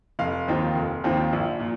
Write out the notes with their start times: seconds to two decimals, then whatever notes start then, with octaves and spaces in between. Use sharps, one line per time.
0.19 F1 F5
0.48 D#2 D#3 C4 F4
0.75 F1
1.04 D#2 D#3 C4 F4
1.33 A#1
1.60 A#2